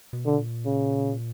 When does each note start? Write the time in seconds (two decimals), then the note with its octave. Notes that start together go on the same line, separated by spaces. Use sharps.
0.13 B2
0.26 D3
0.39 A#2
0.66 C#3